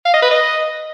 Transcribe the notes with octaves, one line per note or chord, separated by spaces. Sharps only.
F5
D#5
B4
D#5